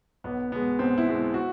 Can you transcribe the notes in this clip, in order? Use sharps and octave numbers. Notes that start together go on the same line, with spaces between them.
B1 B3
B2 G#3 B3
B1 C4
E4
B2 G#3
F#4